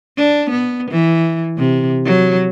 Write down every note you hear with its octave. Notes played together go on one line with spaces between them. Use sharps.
D4
B3
E3
C3
F#3